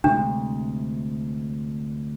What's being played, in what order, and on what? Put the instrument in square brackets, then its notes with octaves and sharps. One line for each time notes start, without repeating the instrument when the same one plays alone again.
[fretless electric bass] D2 C3 G#3 [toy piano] D4